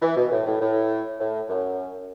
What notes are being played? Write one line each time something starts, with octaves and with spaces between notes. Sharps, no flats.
E3
B2
A2
A2
A2
A2
F#2